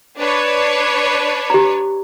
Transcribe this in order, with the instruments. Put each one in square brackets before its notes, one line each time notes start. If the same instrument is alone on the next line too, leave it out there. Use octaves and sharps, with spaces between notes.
[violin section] D4 B4 C#5
[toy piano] G4 A#5